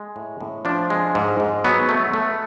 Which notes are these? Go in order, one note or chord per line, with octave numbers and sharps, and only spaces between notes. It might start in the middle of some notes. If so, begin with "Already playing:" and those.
Already playing: G#3
A2
A2
F3 D4
G#3
G#2
G#2
F#3 B3
A3
A3